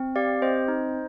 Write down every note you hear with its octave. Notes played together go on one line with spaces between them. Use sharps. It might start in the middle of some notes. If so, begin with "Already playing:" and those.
Already playing: C4
G4 D5 F5
C4 C5 D#5
D#4